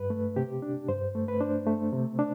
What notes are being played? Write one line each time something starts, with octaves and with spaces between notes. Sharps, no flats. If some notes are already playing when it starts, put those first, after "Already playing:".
Already playing: G2 B4
A3
C3 G4
D4
G2 C5
A3
B4
D4 C5
A3
C3
D4